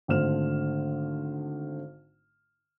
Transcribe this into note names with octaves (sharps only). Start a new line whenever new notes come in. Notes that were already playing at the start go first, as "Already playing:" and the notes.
G#1 D3 A3 C5 F6 E7